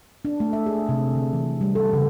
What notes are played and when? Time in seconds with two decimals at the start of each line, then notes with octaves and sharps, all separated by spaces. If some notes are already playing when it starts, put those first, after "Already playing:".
0.25 D4
0.40 A3
0.53 E5
0.66 G#4
0.89 C3
1.15 D3
1.33 E3
1.61 G3
1.75 A4
1.93 C#3